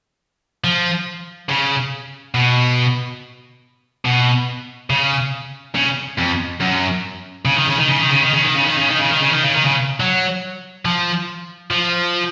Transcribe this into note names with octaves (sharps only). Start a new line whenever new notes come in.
F3
C#3
B2
B2
C#3
C#3
F2
F#2
C#3
D#3
C#3
D#3
C#3
D#3
C#3
D#3
C#3
D#3
C#3
D#3
C#3
D#3
C#3
D#3
C#3
D#3
C#3
D#3
C#3
F#3
F3
F3